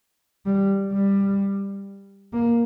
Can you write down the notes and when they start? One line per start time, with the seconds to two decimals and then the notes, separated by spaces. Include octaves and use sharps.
0.46 G3
0.92 G3
2.33 A#3